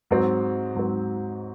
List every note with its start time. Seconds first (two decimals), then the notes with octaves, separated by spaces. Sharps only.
0.11 G#2 F#3 C4
0.75 G#2 F#3 C4